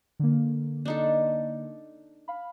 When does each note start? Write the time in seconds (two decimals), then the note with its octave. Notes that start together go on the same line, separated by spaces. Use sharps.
0.19 D3 A#3
0.85 D4 D#4 A4
2.28 F5 B5